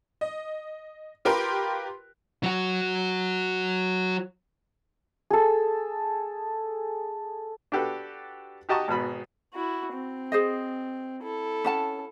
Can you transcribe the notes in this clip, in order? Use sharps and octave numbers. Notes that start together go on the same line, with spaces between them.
D#5
F4 G4 A#4 B4 G5 C6
F#3 F#4
G#4 A4
D4 F#4 G4 A4 B4
F#4 G4 D#5 A5 A#5 C#6
G#1 G#2 B2 B5
E4 F#4
C4
G#4 C5 D#5
E4 A4
C#4 F#5 A5